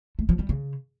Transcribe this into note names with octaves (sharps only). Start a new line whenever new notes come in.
A3
F3
G3
C#3